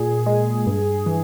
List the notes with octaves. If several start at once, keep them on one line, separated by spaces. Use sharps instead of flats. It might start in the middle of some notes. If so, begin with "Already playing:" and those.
Already playing: A#2 G#4
G#3
G2
E3